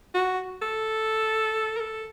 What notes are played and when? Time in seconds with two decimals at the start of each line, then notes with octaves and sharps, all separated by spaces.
0.14 F#4
0.62 A4
1.77 A#4
1.80 A4